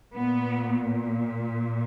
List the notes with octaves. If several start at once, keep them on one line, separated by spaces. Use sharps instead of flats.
A#2 B3